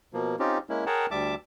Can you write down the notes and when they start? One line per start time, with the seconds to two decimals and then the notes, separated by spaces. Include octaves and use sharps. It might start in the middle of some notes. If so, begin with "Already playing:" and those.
0.13 B2 F3 A#3
0.39 C4 C#4 D#4 F4 G4
0.69 G#3 A#3 C#4 E4
0.86 G#4 A#4 C#5 F#5 G5 A5
1.11 D2 G3 E5 A5 D6